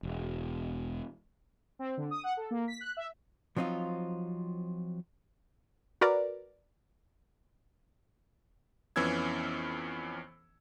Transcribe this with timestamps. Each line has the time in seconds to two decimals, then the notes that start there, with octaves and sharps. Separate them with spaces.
0.03 E1
1.79 C4
1.97 D3
2.11 D#6
2.24 F#5
2.37 A4
2.51 A#3
2.68 B6
2.81 F#6
2.97 E5
3.57 F3 F#3 C4 D#4 F4
6.01 F#4 A#4 B4 D5
8.96 F2 E3 B3 C#4 E6 G#6